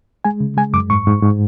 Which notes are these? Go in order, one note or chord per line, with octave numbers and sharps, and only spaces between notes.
G#3 G#5
C#3
G#3 G#5
F#2 D6
G#2 C#6
G#2
G#2